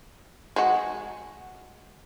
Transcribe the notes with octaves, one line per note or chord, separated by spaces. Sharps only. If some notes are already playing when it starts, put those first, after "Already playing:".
G#3 F#4